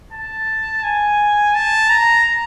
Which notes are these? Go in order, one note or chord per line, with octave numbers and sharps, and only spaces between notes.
A5
G#5
A5
A#5